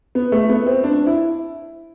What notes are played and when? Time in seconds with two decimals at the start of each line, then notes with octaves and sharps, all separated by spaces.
0.15 B3
0.32 A3
0.49 B3
0.66 C4
0.84 D4
1.07 E4